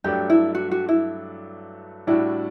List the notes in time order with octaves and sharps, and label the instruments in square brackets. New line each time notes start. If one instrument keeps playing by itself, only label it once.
[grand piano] G2 F#3 A3 D4 [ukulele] G4
[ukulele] E4
F#4
F#4
E4
[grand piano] A2 G3 D4 F#4 [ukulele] E4